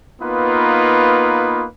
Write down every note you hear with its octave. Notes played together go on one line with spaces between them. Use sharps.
A#3 B3 D#4 F4 B4